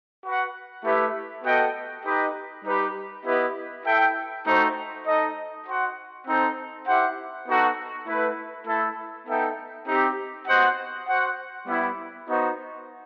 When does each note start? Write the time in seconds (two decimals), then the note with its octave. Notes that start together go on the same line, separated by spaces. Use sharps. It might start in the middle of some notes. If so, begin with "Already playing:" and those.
0.24 F#4 B4 F#5
0.84 A3 E4 G4 B4 E5
1.44 B3 F#4 A4 D#5 G5
2.05 D#4 G4 B4 D#5
2.65 G3 D#4 G4 B4
3.25 B3 E4 G4 B4 D#5
3.85 E4 A4 E5 G5
4.45 A3 D#4 F#4 C5
5.05 D#4 A4 D#5
5.66 F#4 C5 F#5
6.26 C4 D#4 A4 C5
6.86 E4 G4 C5 F#5
7.47 B3 D#4 F#4 A4
8.06 A3 E4 B4
8.67 A3 E4 A4
9.26 B3 D#4 A4 E5 G5
9.87 C4 D#4 G4
10.47 B3 F#4 C5 D#5 F#5
11.07 F#4 C5 F#5
11.67 G3 B3 E4
12.28 B3 D#4 F#4 C5 D#5